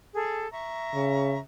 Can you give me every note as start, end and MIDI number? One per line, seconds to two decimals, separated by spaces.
0.13 0.49 68
0.13 0.49 69
0.52 1.39 76
0.52 1.39 82
0.52 1.39 85
0.94 1.38 49